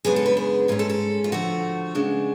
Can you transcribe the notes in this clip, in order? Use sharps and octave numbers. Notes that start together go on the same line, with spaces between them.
F#2 C#3 G#3 B3 D4 G#4
A4
B4
G#4
G#2 G#3 C#4 F4
A4
A4
F4
D3 F3 A3 F#4
C#3 G#3 D4